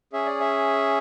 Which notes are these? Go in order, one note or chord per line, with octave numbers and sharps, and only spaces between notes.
C#4 G#4 E5
D5
E5